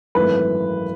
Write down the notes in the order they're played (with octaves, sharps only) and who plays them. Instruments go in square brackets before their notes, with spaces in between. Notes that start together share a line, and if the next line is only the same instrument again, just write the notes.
[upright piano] G#1 F#2 E3 A3 B4